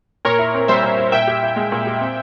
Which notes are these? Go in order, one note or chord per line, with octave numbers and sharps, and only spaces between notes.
A#2 A#4 C#5
E4
C4
G3 C5 E5
A#2
E4
A#2 E5 G5
G4
E4
G#3
A#2
G4
C4